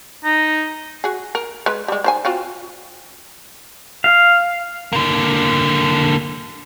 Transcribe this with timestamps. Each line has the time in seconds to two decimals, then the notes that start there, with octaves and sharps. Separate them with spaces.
0.24 D#4
1.04 F#4 G#4
1.35 A#4
1.66 G#3 B4
1.88 G3 G#3
2.04 D#3 C5 G#5
2.25 C4 F4 F#4
4.04 F5
4.93 D3 A#3